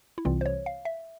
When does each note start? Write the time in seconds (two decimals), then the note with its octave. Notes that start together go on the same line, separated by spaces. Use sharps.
0.18 E4
0.25 C2 C3 E3 G3 C4 F4
0.41 C5
0.46 C#5
0.66 F5
0.85 E5